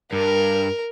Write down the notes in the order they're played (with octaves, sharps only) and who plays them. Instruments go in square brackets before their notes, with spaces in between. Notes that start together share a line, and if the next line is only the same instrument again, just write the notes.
[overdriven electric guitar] G2 [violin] A#4